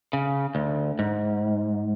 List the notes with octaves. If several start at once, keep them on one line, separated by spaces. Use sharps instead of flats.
C#3
D2
G#2